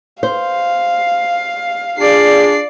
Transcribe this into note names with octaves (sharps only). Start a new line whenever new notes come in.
C5 F5
D4 F4 G#4 D5 C7